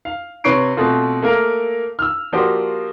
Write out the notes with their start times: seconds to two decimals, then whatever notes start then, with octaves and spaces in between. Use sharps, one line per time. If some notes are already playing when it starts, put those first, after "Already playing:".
0.05 F5
0.44 C3 B4 C#5 C#6 C7 D7
0.77 B2 A3 C4 F4
1.22 A3 A#3 A#4 F5
1.99 E6 F6
2.33 F3 A#3 F#4 G4 C5 D5